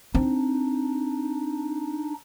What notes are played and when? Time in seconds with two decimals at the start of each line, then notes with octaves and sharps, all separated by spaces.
0.15 C4 D4 D#4